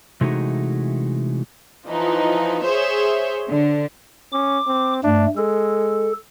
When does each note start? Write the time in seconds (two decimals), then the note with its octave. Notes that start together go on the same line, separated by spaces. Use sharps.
0.21 C3 E3 G#3 A3 D#4 F#4
1.87 E3 F3 D#4
2.64 G#4 C5 C#5 E5
3.49 D3
4.33 C#4 D6
4.67 C4
5.04 G2 A3 D4
5.37 G#3 A4